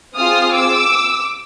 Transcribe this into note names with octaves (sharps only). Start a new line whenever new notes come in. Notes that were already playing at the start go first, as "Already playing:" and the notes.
C4 F4 G#4 D#6 F6
D6 E6